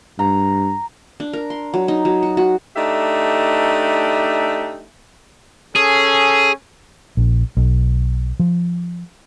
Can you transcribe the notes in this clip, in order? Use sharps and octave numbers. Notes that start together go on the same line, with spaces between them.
G2 A#5
D4
A#4
C6
F#3
D#4
F#3
F#4
F#4
A3 D4 D#4 G4 E5
C#4 G#4 A4
A#1
B1
F3